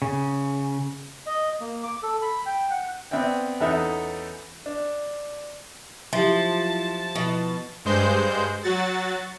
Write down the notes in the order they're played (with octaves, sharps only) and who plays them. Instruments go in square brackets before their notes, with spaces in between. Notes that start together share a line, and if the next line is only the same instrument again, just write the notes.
[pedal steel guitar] C#3
[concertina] D#5
A#3
D6
A4
B5
G5
F#5
[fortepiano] B3 C4 D5 E5 G5
E2 B3 C#4 D#4 A4 E5
D4
[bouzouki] F3 [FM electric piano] F#3 E4 [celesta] G4 E5 [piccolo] A5
[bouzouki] B2 [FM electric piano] F3 E4
[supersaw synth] G2 G#3 C5 G6
F#3 F#4 A6